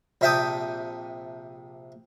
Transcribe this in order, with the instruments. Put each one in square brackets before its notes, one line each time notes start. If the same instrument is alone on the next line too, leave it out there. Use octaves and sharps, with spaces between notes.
[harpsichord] A#1 C3 E5 G5 A5 D#6